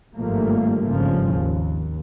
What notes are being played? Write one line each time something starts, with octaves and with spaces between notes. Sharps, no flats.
G#1 G2 F3 G3 A3 A#3
G#1 G2 C#3 F3
D#2